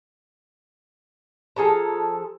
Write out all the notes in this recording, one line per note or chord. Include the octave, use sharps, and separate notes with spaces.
F3 G#4 A4 A#5